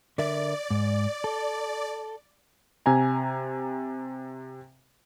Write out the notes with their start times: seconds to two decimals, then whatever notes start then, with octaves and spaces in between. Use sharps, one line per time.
0.18 D3 A#4 D5 E5
0.70 G#2
1.24 A4
2.86 C3 G#5 A#5